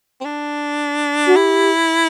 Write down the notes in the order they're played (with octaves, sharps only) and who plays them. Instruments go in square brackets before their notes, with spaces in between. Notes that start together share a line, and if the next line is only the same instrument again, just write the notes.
[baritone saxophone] C4
D4
[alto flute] F#4
[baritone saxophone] E4 [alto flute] G4